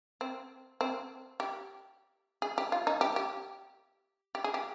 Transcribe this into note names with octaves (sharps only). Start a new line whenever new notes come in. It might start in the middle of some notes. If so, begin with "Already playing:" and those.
C4
C4
G4
G#4
G4
F4
D#4
G4
G4
G4
G#4
G4